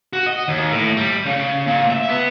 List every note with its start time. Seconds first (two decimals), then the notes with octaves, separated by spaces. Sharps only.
0.13 F#4
0.26 D#5
0.48 D#2
0.71 A2
0.97 G3
1.26 C#3
1.67 A#2
1.90 E5
2.09 B3